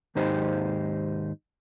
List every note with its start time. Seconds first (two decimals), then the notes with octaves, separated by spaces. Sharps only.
0.15 D#2 G#2 D#4 G4 C5